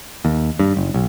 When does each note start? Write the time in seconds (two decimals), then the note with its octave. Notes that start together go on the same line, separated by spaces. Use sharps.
0.25 D#2
0.59 G2
0.77 F#1
0.94 B1